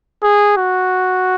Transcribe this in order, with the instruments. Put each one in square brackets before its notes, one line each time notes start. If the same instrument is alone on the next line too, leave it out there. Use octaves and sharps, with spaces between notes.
[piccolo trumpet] G#4
F#4